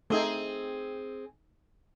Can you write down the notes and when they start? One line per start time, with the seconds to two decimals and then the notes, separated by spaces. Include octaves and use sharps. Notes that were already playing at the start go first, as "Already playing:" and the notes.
0.10 A3 C4 D#4 G#4